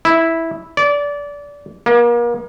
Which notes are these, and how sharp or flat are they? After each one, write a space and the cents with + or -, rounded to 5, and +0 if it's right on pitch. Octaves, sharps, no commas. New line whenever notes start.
E4 -5
D5 -25
A#3 +35